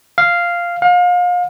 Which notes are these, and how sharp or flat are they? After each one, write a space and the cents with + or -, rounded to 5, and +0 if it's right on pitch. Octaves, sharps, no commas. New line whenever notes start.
F5 -5
F5 +35